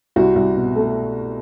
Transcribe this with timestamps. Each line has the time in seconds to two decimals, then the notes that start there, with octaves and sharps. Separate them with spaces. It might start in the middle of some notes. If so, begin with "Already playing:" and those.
0.16 C2 F#4
0.36 C2
0.56 B2
0.76 A3